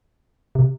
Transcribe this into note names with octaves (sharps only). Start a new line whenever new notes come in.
C3